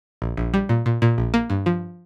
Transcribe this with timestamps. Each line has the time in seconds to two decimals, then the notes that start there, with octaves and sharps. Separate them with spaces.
0.22 A#1
0.37 A#1
0.54 G3
0.69 A#2
0.86 A#2
1.02 A#2
1.18 A#1
1.34 A#3
1.50 G2
1.66 F3